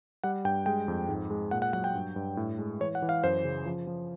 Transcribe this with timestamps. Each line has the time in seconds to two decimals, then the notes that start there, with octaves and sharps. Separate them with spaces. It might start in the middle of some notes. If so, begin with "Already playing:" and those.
0.24 G3 F#5
0.45 G2 G5
0.66 G#3 G5
0.88 F2
1.08 G#2
1.30 G#3
1.51 A#2 F#5
1.62 F#5
1.73 F#3 F#5
1.84 G5
1.94 G2
2.16 G2
2.37 A2
2.59 G#3
2.81 E3 C#5
2.95 F#5
3.02 E3
3.09 F5
3.24 F#2 C5
3.44 C#3
3.66 F3
3.87 F3